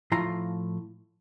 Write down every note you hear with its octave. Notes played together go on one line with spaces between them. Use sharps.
A2 F3 E4 F4 A#5 C6